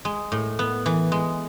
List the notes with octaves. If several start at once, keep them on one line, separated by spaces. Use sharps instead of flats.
G#3
A2
B3
E3
G#3